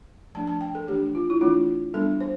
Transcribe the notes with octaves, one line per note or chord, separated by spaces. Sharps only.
F3 A3 D4 A5
A5
G5
A4
E3 A3 D4 G4
F4
E4
E3 A3 D4 F4
G3 B3 D4 A4
C5